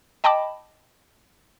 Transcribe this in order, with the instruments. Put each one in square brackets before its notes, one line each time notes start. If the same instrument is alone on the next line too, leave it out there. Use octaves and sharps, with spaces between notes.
[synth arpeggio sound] D#5 G5 A5 B5 D6